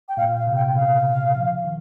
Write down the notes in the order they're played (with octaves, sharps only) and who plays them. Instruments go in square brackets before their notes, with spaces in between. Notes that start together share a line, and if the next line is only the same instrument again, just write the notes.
[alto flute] G5
[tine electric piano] A#2 [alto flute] F5
[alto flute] F5
[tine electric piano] C3
[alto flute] G5
[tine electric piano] C#3 [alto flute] F5
[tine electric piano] F3
D#3